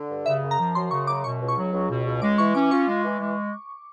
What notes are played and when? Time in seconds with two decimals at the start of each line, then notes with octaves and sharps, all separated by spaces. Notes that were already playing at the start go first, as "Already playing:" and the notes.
Already playing: D3
0.09 G2
0.26 C#3 E5
0.43 F#2
0.51 A#5
0.59 F3
0.75 F#2 C6
0.91 C#3 C#6
1.07 F#2 D6
1.24 B2 C#6
1.40 C#2
1.48 C#6
1.57 F#3
1.73 C#2
1.89 B2
2.06 C#2
2.22 G#3 D6
2.38 E3 C#6
2.54 C#4 D6
2.71 F4 C#6
2.87 G#3
3.04 E3
3.20 G#3